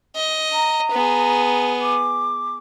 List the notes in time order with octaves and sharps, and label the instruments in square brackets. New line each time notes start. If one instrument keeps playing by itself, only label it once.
[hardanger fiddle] D#5
[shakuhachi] A#5
[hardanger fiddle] B3 G#4
[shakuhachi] D6